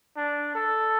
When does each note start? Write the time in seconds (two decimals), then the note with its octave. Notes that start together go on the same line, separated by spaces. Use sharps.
0.16 D4
0.55 A4